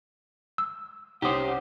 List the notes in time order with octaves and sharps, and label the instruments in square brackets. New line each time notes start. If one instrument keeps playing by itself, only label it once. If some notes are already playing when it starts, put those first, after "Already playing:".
[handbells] E6
[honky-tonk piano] C2 C#4 D6 [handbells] D#4 D#6 [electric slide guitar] G4 C5 [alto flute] F#5